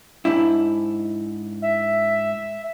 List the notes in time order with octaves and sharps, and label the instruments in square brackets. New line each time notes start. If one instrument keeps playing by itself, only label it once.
[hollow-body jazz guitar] G#2 D4 E4
[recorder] E5